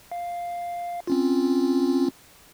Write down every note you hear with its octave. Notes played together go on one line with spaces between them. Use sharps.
F5
C4 C#4 F4